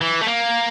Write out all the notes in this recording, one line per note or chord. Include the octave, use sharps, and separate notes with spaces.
E3
A3
A#3